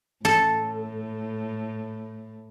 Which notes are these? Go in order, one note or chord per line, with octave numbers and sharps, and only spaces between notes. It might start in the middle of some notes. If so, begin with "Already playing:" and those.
A2 A4